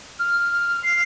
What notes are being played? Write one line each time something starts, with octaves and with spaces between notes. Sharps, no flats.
F6
C7